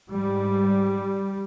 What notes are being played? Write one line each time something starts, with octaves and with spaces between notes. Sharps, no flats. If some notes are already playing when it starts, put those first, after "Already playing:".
G#2 G3